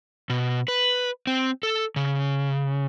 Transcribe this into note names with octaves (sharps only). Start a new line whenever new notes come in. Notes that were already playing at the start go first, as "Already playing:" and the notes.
B2
B4
C4
A4
C#3